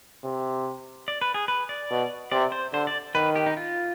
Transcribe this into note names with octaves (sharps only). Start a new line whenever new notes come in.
C3
D5
B4
G#4
B4
D5
B2
C3 D5
C5
D3 C5
D5
D#3 B4
G4
D#4
F4